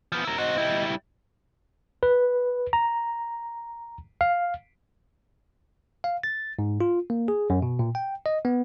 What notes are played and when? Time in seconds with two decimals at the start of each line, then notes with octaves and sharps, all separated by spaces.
0.12 F3 B3
0.25 E4 A#4
0.38 C4 F#4 D#5
0.58 G3 E4
2.03 B4
2.73 A#5
4.21 F5
6.04 F5
6.23 A6
6.59 G#2
6.81 F4
7.10 A#3
7.28 G#4
7.50 F#2
7.62 B2
7.79 A#2
7.95 G5
8.26 D#5
8.45 B3